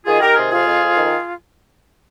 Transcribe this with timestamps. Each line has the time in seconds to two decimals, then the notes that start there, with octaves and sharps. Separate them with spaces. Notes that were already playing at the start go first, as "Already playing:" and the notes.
0.06 D#3 F4 G#4
0.20 D#3 G4 A#4
0.36 C3 F4 G#4
0.51 F2 F4 G#4
0.66 F2
0.81 F2
0.97 D#3